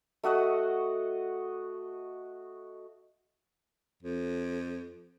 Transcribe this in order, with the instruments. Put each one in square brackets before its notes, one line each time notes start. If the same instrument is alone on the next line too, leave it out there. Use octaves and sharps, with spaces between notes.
[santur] A3 F#4 D#5 F#5
[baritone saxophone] F2